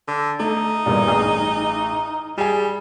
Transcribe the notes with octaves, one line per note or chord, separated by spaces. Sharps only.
D3
A3 D#4
E2 G2 A#2
A1 G#4 D#6
G3 G#4 G#5